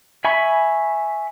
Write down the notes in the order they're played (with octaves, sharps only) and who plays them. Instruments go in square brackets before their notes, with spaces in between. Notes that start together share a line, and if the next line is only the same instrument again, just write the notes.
[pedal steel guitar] E5 G#5 B5 C#6